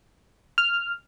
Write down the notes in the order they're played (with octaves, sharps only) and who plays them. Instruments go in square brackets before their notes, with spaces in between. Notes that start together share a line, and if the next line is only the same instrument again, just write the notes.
[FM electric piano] F6